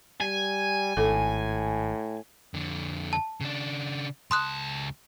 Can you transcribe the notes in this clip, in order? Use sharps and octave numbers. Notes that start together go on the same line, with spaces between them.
G3 G#5
G#1 A2 A4 D6
F2 D3
A5
C#3 D4
C#2 A5 C6 D#6 F#6